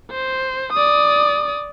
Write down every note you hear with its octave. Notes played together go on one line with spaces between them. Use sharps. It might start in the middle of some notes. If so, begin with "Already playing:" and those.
C5
D5 D#6